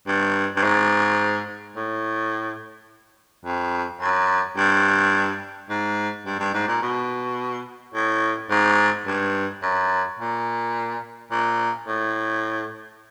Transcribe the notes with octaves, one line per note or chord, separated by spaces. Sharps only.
G2
G2
G#2
A2
F2
F#2
G2
G#2
G2
G2
G#2
A#2
B2
A2
G#2
G2
F#2
A#2
A#2
A2